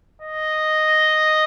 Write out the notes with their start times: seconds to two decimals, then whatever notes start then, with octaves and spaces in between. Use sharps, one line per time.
0.22 D#5